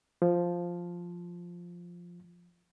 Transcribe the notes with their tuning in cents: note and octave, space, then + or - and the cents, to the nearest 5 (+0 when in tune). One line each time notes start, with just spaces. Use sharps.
F3 +0